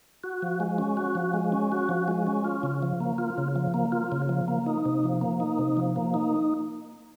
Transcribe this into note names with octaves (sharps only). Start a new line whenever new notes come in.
F#4
F3
G#3
C#4
F#4
F3
G#3
C#4
F#4
F3
G#3
C#4
F4
C#3
F3
A#3
F4
C#3
F3
A#3
F4
C#3
F3
A#3
D#4
C3
F3
A#3
D#4
C3
F3
A#3
D#4